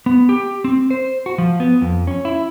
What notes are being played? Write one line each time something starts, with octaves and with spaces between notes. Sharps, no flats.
B3
G4
C4
C5
F#4
F3
B3
F2
C#4
E4